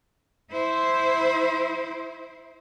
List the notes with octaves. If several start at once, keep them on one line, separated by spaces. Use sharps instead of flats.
E4 C5